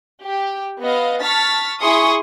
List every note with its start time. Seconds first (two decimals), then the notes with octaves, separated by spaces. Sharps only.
0.23 G4
0.81 B3 D#5 F5
1.22 A5 C#6 F6 A6 B6
1.81 E4 G#4 C6 C#6 D#6